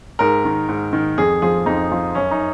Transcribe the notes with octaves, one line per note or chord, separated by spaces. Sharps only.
G#2 A#4
D#3
G#2
D#3
F2 G#4
F3 G#4
F2 D#4
F3
F#2 C#4
D#4